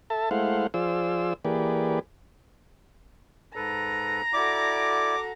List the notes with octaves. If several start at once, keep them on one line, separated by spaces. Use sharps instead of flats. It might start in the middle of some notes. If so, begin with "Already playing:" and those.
A4 E5 A5
G#3 A3 E4 C5 F5 F#5
F3 F4 G#4 C5 D5 E6
E3 A#3 G4 G#4 B4 D5
G#2 A4 B4 A#5
E4 F#4 A4 D5 D6